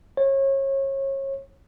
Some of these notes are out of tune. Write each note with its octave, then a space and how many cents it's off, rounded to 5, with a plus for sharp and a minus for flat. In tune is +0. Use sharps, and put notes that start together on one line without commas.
C#5 -30